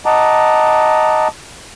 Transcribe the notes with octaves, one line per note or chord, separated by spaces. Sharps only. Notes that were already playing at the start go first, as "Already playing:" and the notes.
D#5 F#5 A5 A#5 D6